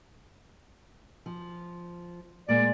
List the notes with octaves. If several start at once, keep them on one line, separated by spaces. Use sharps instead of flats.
F3
A#2 G#3 A#3 D5